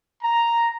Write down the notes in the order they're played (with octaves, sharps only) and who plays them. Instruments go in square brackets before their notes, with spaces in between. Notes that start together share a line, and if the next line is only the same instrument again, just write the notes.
[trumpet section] A#5